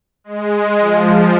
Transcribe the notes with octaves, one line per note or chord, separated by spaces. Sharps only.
G#3
F3